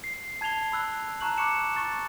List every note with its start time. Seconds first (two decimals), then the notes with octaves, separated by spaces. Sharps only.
0.04 C7
0.41 A5 G#6 C7 F7 G7
0.72 B5 E6 F#6
1.21 A5 A#5 C#6 F#6 F#7
1.38 C#6 D6 F#6 C#7 E7
1.76 C#6 A6